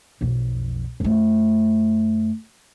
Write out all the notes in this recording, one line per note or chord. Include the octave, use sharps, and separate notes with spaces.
B1 F2
F#2 A3